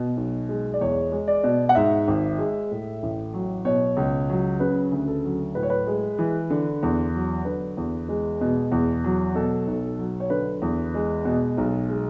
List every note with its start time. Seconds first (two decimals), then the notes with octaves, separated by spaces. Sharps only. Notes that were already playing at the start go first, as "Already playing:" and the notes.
Already playing: B2
0.17 B1
0.49 G#3
0.74 D5
0.81 E2 C#5
1.12 G#3
1.28 D5
1.44 B2
1.69 F#5
1.75 G#2 E5
2.08 G#1
2.39 G#3
2.71 A2
3.03 A1
3.33 F#3
3.65 B2 C#5
3.97 C#2
4.30 F#3
4.60 C#3 B4
4.92 D2
5.08 A4
5.25 F#3
5.55 A2 B4
5.63 C#5
5.70 B4
5.87 G#3
6.19 E3
6.50 D3
6.83 E2
7.14 F#3
7.45 D3 B4
7.77 E2
8.09 G#3
8.41 B2
8.72 E2
9.04 F#3
9.35 B2 A4
9.67 B1
9.99 F#3
10.20 C#5
10.30 D3 B4
10.62 E2
10.94 G#3
11.25 B2
11.58 B1
11.89 G#3